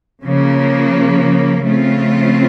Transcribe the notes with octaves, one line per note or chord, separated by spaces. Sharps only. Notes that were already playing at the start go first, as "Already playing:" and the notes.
C#3 F3 A#3
C#3 F3 A3 C4 F4